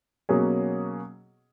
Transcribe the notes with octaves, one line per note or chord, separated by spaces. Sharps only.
B2 F#3 A#3 C#4 G#4